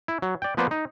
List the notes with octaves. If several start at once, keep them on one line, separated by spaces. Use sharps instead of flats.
E4
F#3
D5 G5
F3 A#3 B3 B4 C5 D5
D#4